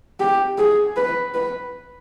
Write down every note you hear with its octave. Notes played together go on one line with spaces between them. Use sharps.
G4
G#4
B4
B4